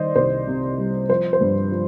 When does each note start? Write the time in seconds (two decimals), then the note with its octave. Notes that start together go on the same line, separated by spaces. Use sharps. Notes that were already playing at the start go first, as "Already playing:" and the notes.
Already playing: D#3 G3 C5 D5 D#5
0.16 C2 C5
0.47 C3
0.78 G3
1.09 F3 C5
1.33 C5
1.41 G2
1.72 F3